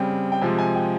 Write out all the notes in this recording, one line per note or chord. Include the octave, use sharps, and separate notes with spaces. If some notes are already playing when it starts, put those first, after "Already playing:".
Already playing: C#3 G3 C4 G5
G5
C3 F3 G#3 G#5
G#5
G5